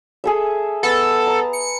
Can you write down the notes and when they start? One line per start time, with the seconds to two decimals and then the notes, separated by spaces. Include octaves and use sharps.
0.24 G#4 A4 E5
0.83 B3 A4
1.27 A#5
1.53 C#7